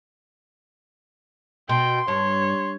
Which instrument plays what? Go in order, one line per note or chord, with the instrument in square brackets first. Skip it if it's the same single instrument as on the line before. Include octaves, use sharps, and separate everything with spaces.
[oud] B2 [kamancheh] G5 [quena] C6
[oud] G2 [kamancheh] C#5